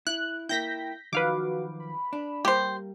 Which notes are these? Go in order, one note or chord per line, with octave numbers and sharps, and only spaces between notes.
E4 F#6
A#3 E4 G5 G6 A#6 B6
D#3 F3 F#3 F#4 B4 F5 D6
B5
D4
G3 A#3 G4 C5